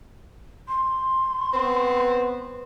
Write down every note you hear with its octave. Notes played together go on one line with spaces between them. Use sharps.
C6
B3 C4 B4